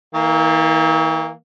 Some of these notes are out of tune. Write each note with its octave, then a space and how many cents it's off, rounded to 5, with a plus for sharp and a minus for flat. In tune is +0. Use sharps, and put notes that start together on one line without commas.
E3 -40 A#3 +0